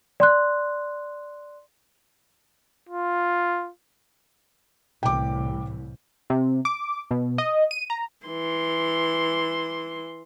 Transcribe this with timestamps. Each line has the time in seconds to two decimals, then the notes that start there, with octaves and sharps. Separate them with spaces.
0.20 D5 C6 F#6
2.89 F4
5.03 C2 A2 E3 G5 D6
6.30 C3
6.65 D6
7.11 B2
7.38 D#5
7.71 D#7
7.90 A#5
8.27 E3 C6